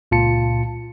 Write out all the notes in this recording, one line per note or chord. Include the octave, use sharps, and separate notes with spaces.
C#2 A#2 F4 A5 C#7